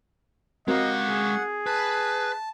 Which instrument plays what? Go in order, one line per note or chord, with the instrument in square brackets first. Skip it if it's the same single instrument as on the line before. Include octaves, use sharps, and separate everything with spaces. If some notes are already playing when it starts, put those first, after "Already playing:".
[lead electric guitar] G#3 F5 [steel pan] C4 F#4 A#4 [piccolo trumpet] D#5 [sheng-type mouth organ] F#5
[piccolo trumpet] G#4
[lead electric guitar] B4 [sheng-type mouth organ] A5